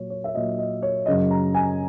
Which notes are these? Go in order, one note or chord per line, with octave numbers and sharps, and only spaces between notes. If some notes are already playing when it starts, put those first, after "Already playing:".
Already playing: A#2 F#3 C#5
C#5
E5
A#2 F#3 D#5
D#5
C#5
F#2 C#3 F#3 D#5
A#5
G#5